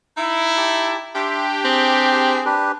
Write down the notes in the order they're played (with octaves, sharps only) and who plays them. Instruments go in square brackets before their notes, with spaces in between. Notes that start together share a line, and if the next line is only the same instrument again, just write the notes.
[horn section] D#4 E4
[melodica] G4 A5
[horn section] D4 G4 [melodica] E5 C6
[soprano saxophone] C4 [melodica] G#4
[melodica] D4 G4 B4